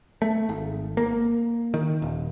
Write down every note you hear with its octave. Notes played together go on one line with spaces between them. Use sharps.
A3
G#1
A#3
D#3
D#1